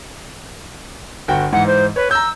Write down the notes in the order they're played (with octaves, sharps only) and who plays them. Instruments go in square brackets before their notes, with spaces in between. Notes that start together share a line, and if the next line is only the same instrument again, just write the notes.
[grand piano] G1 F#4 G5
[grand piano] G#2 E3 [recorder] F#5
[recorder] C5
[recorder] B4 [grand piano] C#5
[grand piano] A#5 G6 [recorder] E6